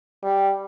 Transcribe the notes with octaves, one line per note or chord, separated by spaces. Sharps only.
G3